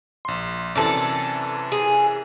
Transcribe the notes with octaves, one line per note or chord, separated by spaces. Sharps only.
A#1 C6
F#2 C3 E3 A4 D5
G#4